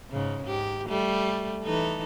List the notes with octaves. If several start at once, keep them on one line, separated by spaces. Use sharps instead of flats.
G#2 C#3
G#2 G4
G3 A3
E3 D#4 A4